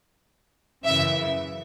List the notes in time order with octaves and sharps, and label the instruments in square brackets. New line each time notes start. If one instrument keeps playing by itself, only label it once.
[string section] F#2 C#3 E3 E5